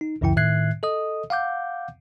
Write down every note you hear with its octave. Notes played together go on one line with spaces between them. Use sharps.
D#4
C#2 F#2 C#3 E3 E4 G5
A2 D#3 E5 F#6 G#6 C7
A4 D#5 D#6
F5 F#5 D6 G6